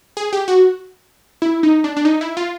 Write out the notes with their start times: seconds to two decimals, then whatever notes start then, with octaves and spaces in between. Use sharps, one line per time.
0.17 G#4
0.33 G4
0.48 F#4
1.42 E4
1.63 D#4
1.84 D4
1.97 D4
2.05 D#4
2.21 E4
2.37 F4